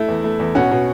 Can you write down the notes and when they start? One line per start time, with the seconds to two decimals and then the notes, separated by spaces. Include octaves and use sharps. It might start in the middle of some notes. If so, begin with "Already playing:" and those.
Already playing: A3 E4
0.08 E2
0.24 A3
0.40 E2
0.55 B2 C#4 F#4
0.71 B2